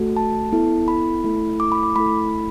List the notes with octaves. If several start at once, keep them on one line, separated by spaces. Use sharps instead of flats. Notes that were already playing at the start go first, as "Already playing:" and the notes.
Already playing: A3 F#4 A4
A5
B3 E4 A4
B5
A3 E4 A4
D6
B5
D6
A3 E4 A4 B5